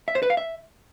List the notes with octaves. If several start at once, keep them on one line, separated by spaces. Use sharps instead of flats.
E5
C5
B4
F5
E5